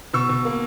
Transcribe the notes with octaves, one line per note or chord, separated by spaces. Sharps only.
B2 C#6 E6
B2
A#3